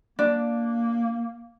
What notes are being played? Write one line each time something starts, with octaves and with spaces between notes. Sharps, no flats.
A#3 D4